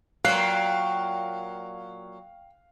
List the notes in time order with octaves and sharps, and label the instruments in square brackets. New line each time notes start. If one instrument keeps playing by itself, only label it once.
[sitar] A#2 F#3 [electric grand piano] F5 F#6 C7 [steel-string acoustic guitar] G5